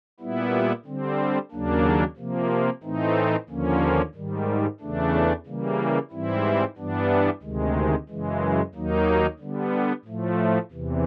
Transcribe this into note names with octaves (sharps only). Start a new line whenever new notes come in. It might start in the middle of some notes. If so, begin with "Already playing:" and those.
A#2 G3 B3 E4
D3 G3 C4
D#2 C#3 F#3 A#3 D4
C3 F3 A#3
A2 E3 A3 C4 D#4
D#2 D3 F3 A#3 C#4
G#2 D#3 G3
E2 C#3 E3 A3 D4
C#3 E3 G3 A#3
G#2 E3 G3 C4 E4
G2 E3 G3 B3 D4
D2 C3 D#3 G#3
F#2 C#3 E3 G#3
D#2 D#3 F#3 A#3 D#4
D3 G3 B3
A2 F3 A3
E2 C3 E3